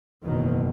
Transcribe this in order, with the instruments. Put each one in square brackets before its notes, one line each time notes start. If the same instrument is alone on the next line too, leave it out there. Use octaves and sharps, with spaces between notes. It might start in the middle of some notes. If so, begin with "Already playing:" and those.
[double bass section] F#1 E2 B2 D#3